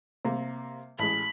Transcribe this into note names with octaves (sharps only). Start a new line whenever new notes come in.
C3 A#3
A1 G#3 B5